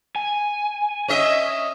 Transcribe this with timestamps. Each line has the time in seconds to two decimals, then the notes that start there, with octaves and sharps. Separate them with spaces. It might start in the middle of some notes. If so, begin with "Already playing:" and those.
0.16 G#5
1.08 C#4 D#5 E5